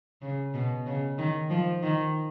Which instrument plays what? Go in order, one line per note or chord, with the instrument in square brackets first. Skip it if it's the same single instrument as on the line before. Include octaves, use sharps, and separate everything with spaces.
[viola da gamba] C#3
B2
C#3
D#3
F3
D#3